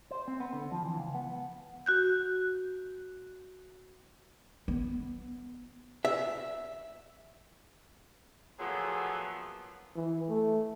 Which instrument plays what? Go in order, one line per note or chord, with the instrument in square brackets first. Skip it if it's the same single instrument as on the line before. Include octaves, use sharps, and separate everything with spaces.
[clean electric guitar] C5
C4
B3
D3
F3
E3
C#2
B3
[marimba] F#4 F#6 G6
[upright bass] B3
[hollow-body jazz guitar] E5
[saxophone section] A#2 F3 F#3 A3 B3 G#4
[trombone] E3
A3